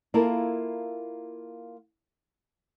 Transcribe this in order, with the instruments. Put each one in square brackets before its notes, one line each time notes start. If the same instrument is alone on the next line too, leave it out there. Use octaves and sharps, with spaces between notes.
[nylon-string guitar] A#3 E4 F4 A4 A#4